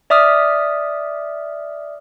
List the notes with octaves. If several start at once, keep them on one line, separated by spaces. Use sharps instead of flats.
D5 E5 D6 D#6 F6 B6